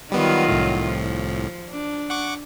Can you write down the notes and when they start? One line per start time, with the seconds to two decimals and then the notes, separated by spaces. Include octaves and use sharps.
0.12 D#3 F#3 G3 B3 F4
0.48 C2 A2
0.85 F3
1.70 D4
2.10 F#5 C#6 D6